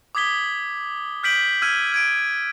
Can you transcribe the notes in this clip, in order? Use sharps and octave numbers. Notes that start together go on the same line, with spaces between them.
D6 D#6 G#6 B6 G7
F6 G6 B6 D7 F#7
E6 F6 G#6 D#7
F6 G#6 D7